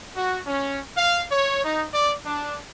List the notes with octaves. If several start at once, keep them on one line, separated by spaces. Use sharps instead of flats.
F#4
C#4
F5
C#5
D#4
D5
D4